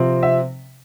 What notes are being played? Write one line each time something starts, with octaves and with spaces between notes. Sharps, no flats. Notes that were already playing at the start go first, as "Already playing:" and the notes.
Already playing: C3 F3 C4
E5